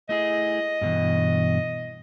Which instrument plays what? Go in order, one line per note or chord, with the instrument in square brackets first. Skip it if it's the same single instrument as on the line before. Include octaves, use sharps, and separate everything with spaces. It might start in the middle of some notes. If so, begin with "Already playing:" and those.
[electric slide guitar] A3 E4 G#4 [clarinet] D#5
[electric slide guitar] G2 B2 E3